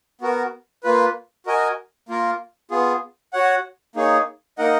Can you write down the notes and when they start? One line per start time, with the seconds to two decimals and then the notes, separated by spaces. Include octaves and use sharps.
0.21 B3 F#4 A#4
0.83 A#3 F4 B4
1.46 F#4 A#4 D#5 G#5
2.09 A#3 F4 A#4
2.71 B3 F4 G#4
3.33 F#4 C#5 F#5
3.96 A#3 D#4 G#4 C#5
4.58 A#3 D#4 A#4 D#5 F#5